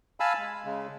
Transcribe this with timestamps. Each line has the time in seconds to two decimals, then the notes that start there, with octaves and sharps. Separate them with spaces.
0.20 F5 G#5 A5 B5 E6
0.38 G#3
0.65 C#3 G#3